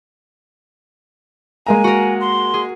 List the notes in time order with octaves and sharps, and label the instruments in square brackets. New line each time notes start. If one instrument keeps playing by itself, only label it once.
[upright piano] G#3 A#3 A#5 [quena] G#5
[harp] F#4 A#4
[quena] C6
[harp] G#4